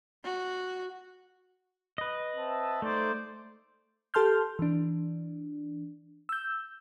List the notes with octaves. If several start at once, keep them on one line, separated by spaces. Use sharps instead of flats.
F#4
B4 D#5
C4 E5 A5
A3 D#4 C5 D5
G4 A4 A5 C6 F6 G6
E3 D4
E6 G6